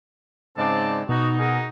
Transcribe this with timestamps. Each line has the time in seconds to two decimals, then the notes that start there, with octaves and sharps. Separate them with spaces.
0.57 G#2 C#3 G#3 C4 D5 A5
1.09 B2 B3 D#4 F#4
1.38 D#4 F#4 G#4 A#4